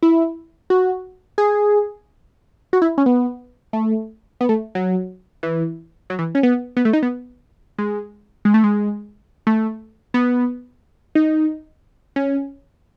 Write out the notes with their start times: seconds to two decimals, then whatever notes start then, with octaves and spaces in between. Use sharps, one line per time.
0.03 E4
0.70 F#4
1.38 G#4
2.73 F#4
2.82 E4
2.98 C#4
3.06 B3
3.73 A3
4.41 B3
4.49 A3
4.75 F#3
5.43 E3
6.10 F#3
6.19 E3
6.35 C#4
6.43 B3
6.77 B3
6.85 A3
6.93 D#4
7.03 B3
7.78 G#3
8.45 G#3
8.54 A3
8.64 G#3
9.47 A3
10.14 B3
11.15 D#4
12.16 C#4